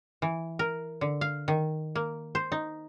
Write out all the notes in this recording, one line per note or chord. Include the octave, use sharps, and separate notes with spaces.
E3
A#4
D3
F5
D#3
A#3
C5
D#4